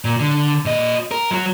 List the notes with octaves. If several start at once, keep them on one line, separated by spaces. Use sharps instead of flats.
A#2
D3
A#2 D#5
A#4
F#3 F#4